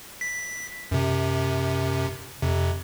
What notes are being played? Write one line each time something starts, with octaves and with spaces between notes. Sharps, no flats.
B6
F#2 C3
F2 C3